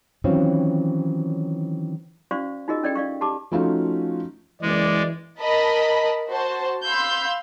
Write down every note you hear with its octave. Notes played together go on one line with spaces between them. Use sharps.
D#3 E3 F#3 C4 C#4 F4
C#4 F#4 C5 D5 F5 C#6
D#4 F4 F#4 G#4 A#4 D#5
C#4 A4 D5 D#5 G5
D5 F5 C#6
G4 A5 B5 D6
F3 A3 C#4 D#4 F4 F#4
F#1 E3 G#3 D5
A#4 D#5 A5 B5
F#4 C5 A5
F5 B5 C6 E6 G6